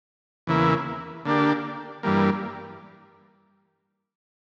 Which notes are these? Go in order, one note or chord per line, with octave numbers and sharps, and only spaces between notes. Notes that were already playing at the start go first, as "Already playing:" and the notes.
E2 C#3 E3 A#3 E4
D3 A#3 D4 G4
G2 E3 G3 A#3